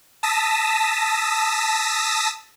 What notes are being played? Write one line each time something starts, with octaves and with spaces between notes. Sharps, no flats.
A5 D#6 E6 A#6 B6